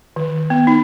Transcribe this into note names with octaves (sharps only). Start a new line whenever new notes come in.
D#3
B3
D#4